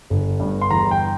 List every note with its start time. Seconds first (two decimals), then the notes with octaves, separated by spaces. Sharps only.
0.10 G1
0.40 G2
0.61 C6
0.70 E2 A#5
0.91 G5